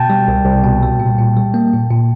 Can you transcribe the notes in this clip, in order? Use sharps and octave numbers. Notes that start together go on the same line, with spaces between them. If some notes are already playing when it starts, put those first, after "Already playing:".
Already playing: B2 G5 A5
G3
C2
C2
B2
G3
A#2
A#2
G3
A#3
A#2
A#2